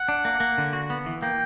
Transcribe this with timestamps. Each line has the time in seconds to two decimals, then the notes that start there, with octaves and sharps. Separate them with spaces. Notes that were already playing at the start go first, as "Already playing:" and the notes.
Already playing: F#5
0.08 D4
0.25 A#3
0.40 A#3
0.58 D3
0.73 F#4
0.90 B3
1.06 E3
1.22 A#3 G5